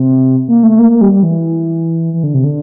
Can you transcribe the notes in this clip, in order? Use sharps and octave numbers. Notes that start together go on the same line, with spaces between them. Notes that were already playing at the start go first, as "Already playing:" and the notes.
Already playing: C3
A#3
A3
A#3
A#3
G3
G3
E3
E3
D3
C3
D3